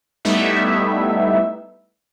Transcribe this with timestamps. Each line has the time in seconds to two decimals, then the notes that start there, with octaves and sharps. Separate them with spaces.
0.25 G3 A3 B3 D#4 E4 E5